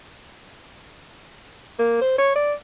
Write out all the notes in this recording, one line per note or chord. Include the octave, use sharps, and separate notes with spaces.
A#3
C5
C#5
D5